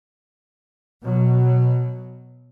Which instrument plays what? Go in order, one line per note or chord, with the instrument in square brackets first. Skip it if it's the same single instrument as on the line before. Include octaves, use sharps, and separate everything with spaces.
[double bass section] B2 F#3